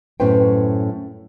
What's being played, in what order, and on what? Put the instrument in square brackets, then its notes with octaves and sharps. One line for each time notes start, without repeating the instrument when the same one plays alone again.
[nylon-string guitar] F#2 A2 C#4 B4 C5 G5